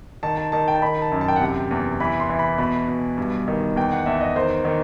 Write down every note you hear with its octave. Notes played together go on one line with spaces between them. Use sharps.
D#3 A5
A5
D#3 A5
G5
A5
D#3 B5
A5
F#2
A5
G5
F#5
C3 G5
E2
E3 B5
C6
E3
B5
B2 B5
B2
G2
D#3
E2 G5
F#5
E2 E5
D#5
D#3 C5
D#3